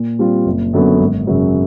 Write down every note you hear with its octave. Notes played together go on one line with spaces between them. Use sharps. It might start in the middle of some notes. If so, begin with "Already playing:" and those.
Already playing: A#2
G3 C4 F4
F#1
F#2 D3 F#3 B3
G#1
F#2 C#3 F#3